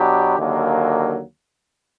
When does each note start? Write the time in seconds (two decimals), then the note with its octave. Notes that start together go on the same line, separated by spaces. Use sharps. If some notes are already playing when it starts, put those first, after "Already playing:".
Already playing: B2 F#3 B3 D4 G4
0.37 D#2 D3 F#3 A#3